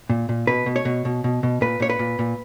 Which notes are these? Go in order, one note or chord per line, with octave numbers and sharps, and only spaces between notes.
A#2
A#2
B2 B4
B2
C#5
B2
B2
B2
B2
A#2 B4
A#2 C#5
B4
A#2
A#2